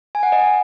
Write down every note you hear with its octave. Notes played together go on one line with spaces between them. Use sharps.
G#5
F#5
D#5